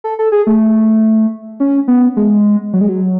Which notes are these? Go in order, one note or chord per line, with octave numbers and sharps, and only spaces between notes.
A4
A4
G#4
A3
C#4
B3
G#3
F#3
G#3
F#3